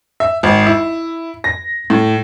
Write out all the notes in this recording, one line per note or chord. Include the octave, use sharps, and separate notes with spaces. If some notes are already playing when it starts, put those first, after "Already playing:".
E5
G#1
E4
A#6
A2